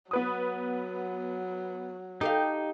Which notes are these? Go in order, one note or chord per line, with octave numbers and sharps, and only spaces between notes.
F#3 B3 B4 D#6
D#4 G4 A4 F5